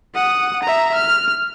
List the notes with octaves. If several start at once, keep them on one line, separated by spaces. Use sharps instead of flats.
F#5 D#6
E5 A#5
F6